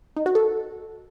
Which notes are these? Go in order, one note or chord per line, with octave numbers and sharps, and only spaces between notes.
D#4
F#4
A4